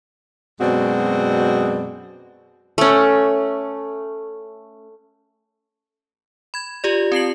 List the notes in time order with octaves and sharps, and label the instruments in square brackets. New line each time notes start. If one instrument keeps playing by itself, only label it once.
[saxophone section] F#2 B2 G#3 C4 F#4 D5
[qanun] A3 C#4
[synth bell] B5 G#6
F4 G4 D5
C4 A5 C7 F#7